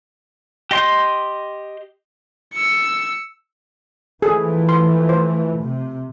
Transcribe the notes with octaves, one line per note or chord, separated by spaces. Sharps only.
G4 D#5 C6 G6
E6 C#7
E3 F3 A3 G#4 A4
C6
C5
C3